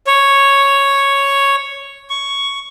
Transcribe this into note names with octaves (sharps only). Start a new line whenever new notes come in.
C#5
C#6